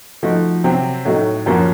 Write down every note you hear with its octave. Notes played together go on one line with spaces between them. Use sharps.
F3 A3 D#4 F#4
C3 F#3 C4
A2 F#3 A3 D#4 F#4
F#2 F3 A#3 C#4 F#4